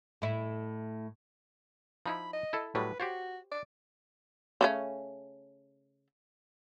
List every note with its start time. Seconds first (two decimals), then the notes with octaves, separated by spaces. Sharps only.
0.22 A2 E4
2.06 F3 D#4 E4 B5
2.33 D#5
2.53 E4 A4
2.75 A2 F#3 G3 B4
3.00 F#4 G4 C5 C#5
3.52 D5
4.61 C#3 A3 C#4